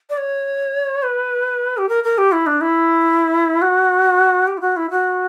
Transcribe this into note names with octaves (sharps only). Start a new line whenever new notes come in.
D5
C#5
B4
G4
A#4
A#4
G4
E4
D4
E4
F#4
G4
E4
F#4
E4
F#4